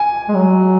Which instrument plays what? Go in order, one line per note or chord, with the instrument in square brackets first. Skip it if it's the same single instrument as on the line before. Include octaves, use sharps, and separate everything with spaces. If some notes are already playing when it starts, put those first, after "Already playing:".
Already playing: [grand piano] G#5
[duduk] G#3
F#3